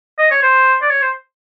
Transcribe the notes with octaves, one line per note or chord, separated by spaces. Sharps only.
D#5
C#5
C5
D5
C#5
C5